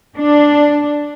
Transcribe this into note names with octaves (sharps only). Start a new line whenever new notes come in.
D4